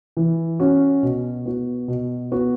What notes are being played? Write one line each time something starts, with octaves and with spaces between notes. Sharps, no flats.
E3
C#4 F#4
B2
B3 F#4
B2
B3 F#4